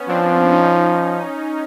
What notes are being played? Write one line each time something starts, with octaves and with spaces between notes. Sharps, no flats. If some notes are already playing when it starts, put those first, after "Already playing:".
Already playing: B3 C#4
F3 C4 D4
C#4 D#4